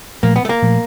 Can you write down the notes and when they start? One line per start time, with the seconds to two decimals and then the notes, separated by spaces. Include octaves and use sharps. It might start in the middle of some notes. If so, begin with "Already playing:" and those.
0.23 A#2 F3 A3 A#3
0.36 B3
0.45 A3
0.49 A#3
0.62 A#2 F3 A3